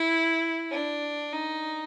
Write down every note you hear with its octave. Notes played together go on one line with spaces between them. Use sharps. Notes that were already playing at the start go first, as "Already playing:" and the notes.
Already playing: E4
D4
D#4